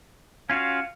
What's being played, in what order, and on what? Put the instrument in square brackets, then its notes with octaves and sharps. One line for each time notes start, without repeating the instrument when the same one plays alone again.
[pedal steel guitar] C#4 F4 F#4 [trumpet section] F5